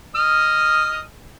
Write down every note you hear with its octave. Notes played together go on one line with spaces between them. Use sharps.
D#5 D#6 F6